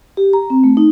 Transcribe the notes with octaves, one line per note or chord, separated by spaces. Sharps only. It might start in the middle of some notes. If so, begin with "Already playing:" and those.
G4
A#5
C4
A3
D#4